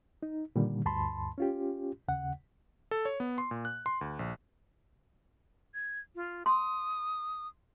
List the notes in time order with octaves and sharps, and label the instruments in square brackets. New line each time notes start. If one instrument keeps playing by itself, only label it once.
[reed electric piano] D#4
A#2 D3 D#3 G3
D2 G2 A5 B5 C6
C#4 F4 G4
D#2 C#3 F#5
[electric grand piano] A4
C#5
B3
C6
A#2
F#6
C6
D2
A#1
[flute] G#6
F4
[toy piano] C6 [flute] D#6